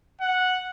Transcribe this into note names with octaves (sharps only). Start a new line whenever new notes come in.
F#5